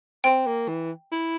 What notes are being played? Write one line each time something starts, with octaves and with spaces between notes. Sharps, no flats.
C4 G5
A#3
E3
E4